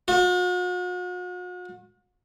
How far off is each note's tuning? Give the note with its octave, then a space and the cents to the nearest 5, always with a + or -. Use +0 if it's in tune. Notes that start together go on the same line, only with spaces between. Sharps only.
F#4 -45